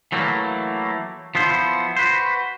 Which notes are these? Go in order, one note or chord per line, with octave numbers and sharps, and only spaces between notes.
E3 F#3 A3 A#3
F3 B3 E4 C5
F#4 B4 C5